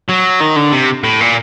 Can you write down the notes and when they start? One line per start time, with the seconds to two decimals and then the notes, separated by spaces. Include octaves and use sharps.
0.09 F#3
0.41 D#3
0.56 D3
0.72 C3
1.04 A2
1.20 A#2